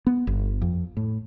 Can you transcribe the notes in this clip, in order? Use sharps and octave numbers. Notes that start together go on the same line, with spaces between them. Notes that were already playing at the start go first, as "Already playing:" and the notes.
B3
G1
F2
A2